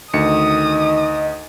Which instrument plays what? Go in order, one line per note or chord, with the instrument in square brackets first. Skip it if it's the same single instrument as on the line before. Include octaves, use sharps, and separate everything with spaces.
[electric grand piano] D2 C#7 [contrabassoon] D#3 [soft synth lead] D#5 [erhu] D#6